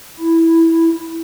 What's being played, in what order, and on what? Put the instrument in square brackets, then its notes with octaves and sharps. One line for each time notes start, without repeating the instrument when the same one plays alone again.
[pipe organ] E4